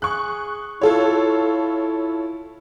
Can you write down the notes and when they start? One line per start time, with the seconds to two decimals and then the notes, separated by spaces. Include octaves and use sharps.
0.02 G#4 C#6 F#6
0.81 E4 F4 A4 C#5